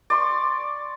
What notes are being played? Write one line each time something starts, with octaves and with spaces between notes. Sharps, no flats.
D5 C6 C#6